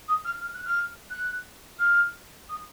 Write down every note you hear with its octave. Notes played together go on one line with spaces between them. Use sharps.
D#6
F6
F6
F#6
F6
F#6
F6
D#6